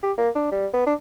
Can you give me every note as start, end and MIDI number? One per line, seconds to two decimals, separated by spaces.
0.03 0.12 67
0.18 0.29 58
0.35 0.50 62
0.51 0.67 55
0.73 0.82 59
0.87 0.94 62